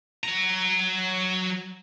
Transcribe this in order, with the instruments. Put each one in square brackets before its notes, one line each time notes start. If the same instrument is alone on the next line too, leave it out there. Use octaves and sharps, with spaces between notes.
[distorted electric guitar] F#3 A#5